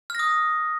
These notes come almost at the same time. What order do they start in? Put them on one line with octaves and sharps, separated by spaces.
F6 A#6 D#6